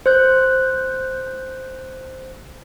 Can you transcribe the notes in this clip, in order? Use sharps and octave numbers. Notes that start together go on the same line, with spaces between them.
C5 F#6 G6